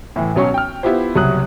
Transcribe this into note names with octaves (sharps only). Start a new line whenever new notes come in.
A2 E3
B1 F#3 C#4 C#6
G5 F6
B3 E4 F4 G4 C5
F#1 C2 F#3 C#5 D#6 F#6